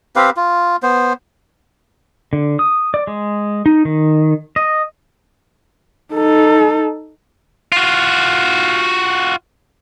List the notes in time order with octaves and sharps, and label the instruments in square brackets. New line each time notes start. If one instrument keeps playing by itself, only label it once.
[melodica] C4 G4 B4 F5
F4
B3 C5
[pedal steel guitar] D3
D#6
D5
G#3
D#4
D#3
D#5
[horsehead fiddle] D#4 A4
[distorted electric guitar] F4 F#4